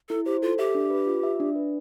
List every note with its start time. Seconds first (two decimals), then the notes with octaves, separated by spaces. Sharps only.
0.09 E4 A4
0.25 G4 C5
0.42 F4 A4
0.58 G4 E5
0.75 D4
0.90 B4
1.07 F4
1.23 E5
1.40 D4
1.55 B4